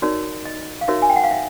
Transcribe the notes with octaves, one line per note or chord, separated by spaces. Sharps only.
D#4 F#4 A#4 C#5 D5
D#5
F5
D#4 F#4 A#4 C#5 E5
G#5
G5
F#5
F5
E5